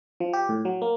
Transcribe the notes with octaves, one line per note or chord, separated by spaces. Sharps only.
F3
G4
A2
F#3
A#3